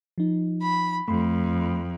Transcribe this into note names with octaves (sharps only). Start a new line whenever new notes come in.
F3 D#4
B5
F2 A3 B5 C6